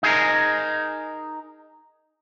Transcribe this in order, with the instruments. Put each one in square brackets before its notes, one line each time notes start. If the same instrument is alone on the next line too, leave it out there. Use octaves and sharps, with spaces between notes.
[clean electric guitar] D#4 G#4 A#4